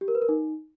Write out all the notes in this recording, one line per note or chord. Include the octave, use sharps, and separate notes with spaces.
G4
A#4
B4
A#4
D#4